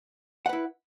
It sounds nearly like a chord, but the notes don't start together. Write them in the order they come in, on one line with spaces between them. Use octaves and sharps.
F#5 B4 E4